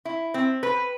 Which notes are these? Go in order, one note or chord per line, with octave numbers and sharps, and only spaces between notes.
E4
C4
B4